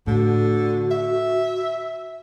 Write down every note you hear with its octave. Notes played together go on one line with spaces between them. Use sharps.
A2 D3 F#4
E5